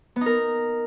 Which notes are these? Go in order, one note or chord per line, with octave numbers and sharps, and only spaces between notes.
B3
D#4
A#4